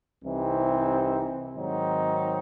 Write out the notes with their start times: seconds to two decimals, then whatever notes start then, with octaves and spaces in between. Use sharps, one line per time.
0.23 C2 C3 E3 C4 D#4
1.56 G#2 D#3 F#3 C4 D#4